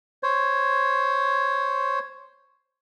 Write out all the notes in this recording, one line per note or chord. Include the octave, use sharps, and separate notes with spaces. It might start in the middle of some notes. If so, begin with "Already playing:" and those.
C5 C#5